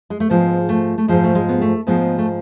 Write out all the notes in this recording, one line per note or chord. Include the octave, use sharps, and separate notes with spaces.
G#3
A3
G#2 F3 G#3 B3
A3
A3
G#2 F3 G#3
A3
G#3
B3
A3
G#2 F3 G#3 B3
A3